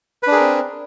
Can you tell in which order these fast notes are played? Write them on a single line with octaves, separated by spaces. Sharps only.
B4 D4 G#4 A#4 C4